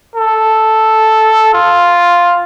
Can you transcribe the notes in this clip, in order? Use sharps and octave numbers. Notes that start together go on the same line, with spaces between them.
A4
F4